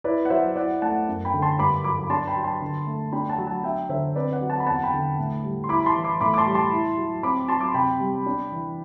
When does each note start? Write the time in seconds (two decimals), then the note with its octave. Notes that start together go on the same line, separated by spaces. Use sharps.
0.04 E4 B4 D5
0.25 F#5
0.30 F#3 C5 E5
0.56 E4 D5 F#5
0.82 A3 F#5 A5
1.08 F#2
1.25 G5 B5
1.34 D3
1.42 A5 C6
1.59 G2 B5 D6
1.84 F#3 B5 D6
2.04 B5
2.10 D4 A5 C6
2.27 G5 B5
2.36 F#3
2.44 A5 C6
2.61 D3
2.87 A3
3.12 D4 G5 B5
3.29 F#5 A5
3.38 F#3
3.46 F#5 A5
3.64 D4 E5 G5
3.89 D3 C5 E5
4.16 C4 B4 D5
4.32 D5 F#5
4.41 F#3
4.50 F#5 A5
4.60 B5
4.67 E2 F#5 A5
4.83 G5 B5
4.93 D3
5.19 A2
5.44 G3
5.64 C6
5.69 E4 B5 D6
5.80 B5
5.86 A5 C6
5.95 E3
6.04 B5 D6
6.21 A2 B5 D6
6.34 D6
6.37 A5 C6
6.46 G3
6.55 A5 C6
6.72 E4
6.98 F#3
7.23 C4 B5 D6
7.48 F#3 A5 C6
7.60 D6
7.68 C6
7.74 C3 G5 B5
8.00 G3
8.26 D4
8.52 E3